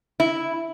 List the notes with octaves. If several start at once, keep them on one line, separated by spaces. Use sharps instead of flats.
E4